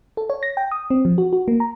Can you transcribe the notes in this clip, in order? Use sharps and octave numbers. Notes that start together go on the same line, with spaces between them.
A4
C#5
A#6
G5
D#6
C4
F3
F#4
F#4
A#3
A#5